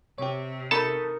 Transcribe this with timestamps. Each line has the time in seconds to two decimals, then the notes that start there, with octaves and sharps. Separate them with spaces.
0.18 C3 G4 C#5
0.71 D#4 A4 A#4 A5 B5 C#6 D#6